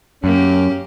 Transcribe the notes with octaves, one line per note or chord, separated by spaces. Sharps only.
F#2 A#3 C#4 G4